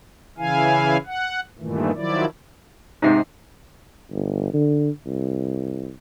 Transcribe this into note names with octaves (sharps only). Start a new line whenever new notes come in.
C#3 E3 E4 F5 G#5
F#5
G2 A#2 D#3 E3 A3
D#3 F3 F#3 E4 D5
G#2 C3 D#4 C7
G1
D3
C2